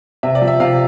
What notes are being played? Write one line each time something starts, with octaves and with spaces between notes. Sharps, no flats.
C3 E5
D5
F3
E5
C3 F5